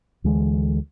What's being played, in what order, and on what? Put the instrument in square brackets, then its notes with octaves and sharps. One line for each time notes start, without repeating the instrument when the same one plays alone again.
[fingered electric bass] D2 D3 E3 G#3